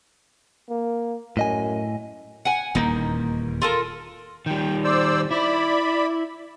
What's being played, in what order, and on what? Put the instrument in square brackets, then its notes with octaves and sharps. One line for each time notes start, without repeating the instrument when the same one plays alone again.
[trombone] A#3
[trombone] F#2 [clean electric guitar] A2 D#5 G#5
[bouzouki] F#5 G#5
[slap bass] D#1 E2 A#3 [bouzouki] D#4
[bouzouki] F4 A4 A#4
[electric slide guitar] D#3 G3 [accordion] G5
[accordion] C5 D5 E6
[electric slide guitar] E4 [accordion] D5 B5